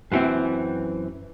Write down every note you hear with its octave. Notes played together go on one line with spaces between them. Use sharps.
F#2 E3 C4